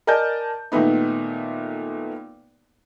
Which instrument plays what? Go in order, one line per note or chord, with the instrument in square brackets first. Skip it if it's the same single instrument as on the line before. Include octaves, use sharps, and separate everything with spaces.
[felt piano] A#4 D5 D#5 G#5 A5 G6
A#2 D#3 A3 B3 D#4